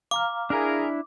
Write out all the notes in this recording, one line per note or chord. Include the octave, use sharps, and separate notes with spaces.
F5 A#5 D6 F6
D4 E4 G#4 A#4